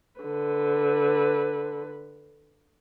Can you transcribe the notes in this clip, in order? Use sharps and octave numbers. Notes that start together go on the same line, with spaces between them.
D3 B4